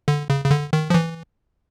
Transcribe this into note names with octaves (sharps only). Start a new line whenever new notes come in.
D3
C#3
C#3
D3
D#3
F3
E3